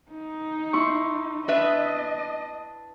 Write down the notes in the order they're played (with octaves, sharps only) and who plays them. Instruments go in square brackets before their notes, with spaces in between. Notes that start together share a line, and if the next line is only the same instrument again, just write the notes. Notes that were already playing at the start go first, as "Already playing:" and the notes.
[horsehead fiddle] D#4
[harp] E4 C6 C#6
[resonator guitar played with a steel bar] D4 B4 E5 [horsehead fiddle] D#5